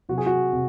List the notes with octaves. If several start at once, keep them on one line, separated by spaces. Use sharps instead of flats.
C3 F#3 F#4
G#4
F#4
C3